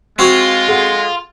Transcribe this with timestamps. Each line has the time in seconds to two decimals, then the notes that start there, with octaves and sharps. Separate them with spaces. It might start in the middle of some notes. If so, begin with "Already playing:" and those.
0.19 G#3 C4 F4 F#4
0.68 G#4 A4 F#5